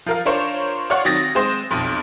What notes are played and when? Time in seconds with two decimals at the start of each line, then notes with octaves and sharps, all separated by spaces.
0.06 F3 A#4 F5
0.25 D4 F4 A#4 C5 C#5
0.90 C#5 D5 F5 F#5 C6 C#6
1.05 D#3 F#3 C4 D#6 A6 A#6
1.35 G#3 C4 C5
1.70 B1 F2 C6